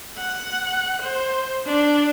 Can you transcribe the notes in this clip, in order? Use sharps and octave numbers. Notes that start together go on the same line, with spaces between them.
F#5
C5
D4